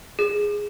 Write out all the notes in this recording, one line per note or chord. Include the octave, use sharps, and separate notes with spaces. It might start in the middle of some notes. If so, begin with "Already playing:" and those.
G#4